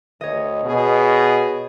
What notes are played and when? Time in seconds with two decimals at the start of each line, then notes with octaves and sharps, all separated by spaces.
0.21 D2 C#5 D#5
0.65 B2 G#4